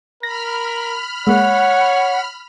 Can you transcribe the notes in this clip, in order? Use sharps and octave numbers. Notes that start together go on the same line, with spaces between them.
A#4 B5 F6 A#6
G#3 A#3 C#5 F#5